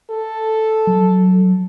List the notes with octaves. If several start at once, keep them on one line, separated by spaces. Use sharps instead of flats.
A4
F#3